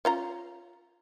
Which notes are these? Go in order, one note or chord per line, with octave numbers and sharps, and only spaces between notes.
C#4 F4 A#5